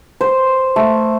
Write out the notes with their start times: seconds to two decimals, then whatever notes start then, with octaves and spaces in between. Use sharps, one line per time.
0.21 C5
0.76 A3